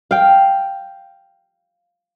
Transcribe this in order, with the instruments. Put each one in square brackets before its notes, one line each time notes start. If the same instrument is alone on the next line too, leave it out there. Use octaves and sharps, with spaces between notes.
[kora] F5 G5